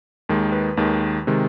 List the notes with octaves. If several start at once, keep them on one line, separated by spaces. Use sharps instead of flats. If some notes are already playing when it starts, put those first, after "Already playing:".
D#2 D#3 G#3
B4
D#2 D#3 G#3
C3 D#3 G#3